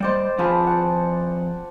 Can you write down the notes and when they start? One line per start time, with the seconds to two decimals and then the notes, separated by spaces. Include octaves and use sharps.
0.01 G3 C5 D5 D#5 G5
0.39 F2 F3 G#4 F5 A5 B5
0.67 F#5 A5